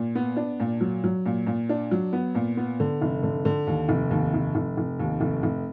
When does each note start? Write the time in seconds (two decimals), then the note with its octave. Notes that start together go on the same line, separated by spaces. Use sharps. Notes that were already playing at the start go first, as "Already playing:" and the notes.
Already playing: A#2
0.15 B3
0.36 D4
0.60 A#2
0.80 F#3
1.04 F#3
1.26 A#2
1.46 A#2
1.69 D4
1.91 F#3
2.13 B3
2.35 A#2
2.57 B3
2.80 D3
3.02 F1
3.23 D3
3.45 D3
3.67 D#2
3.89 F1
4.11 D#2
4.34 F1
4.55 F1
4.77 F1
4.99 D#2
5.21 F1
5.43 F1